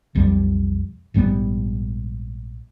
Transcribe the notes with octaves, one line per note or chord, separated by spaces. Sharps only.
B1 F2 F3 G3
A#1 G#2 G3 B3